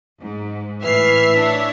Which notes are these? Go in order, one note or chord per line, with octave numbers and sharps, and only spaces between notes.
G#2
A2 E3 E5 F6 C7
D4 C#5